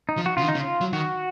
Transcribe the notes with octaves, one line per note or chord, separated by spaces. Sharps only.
D#4
F3
F#4
C#3 F4
D#3
D#4
C#3
F4
F#3
D#3 F#4